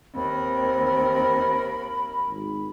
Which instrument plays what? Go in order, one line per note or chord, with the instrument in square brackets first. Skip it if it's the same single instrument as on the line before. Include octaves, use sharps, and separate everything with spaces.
[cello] D#2 A#4 [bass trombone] C4 [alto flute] B5
[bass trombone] G#1